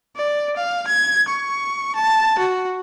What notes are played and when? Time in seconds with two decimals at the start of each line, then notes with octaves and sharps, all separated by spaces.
0.16 D5
0.57 F5
0.87 G#6
1.29 C#6
1.96 A5
2.39 F#4